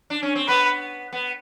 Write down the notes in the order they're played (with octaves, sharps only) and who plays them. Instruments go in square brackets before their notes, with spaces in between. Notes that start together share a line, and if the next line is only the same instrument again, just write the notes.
[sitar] D4
C#4
C4
[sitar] B3 [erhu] B4
[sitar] B3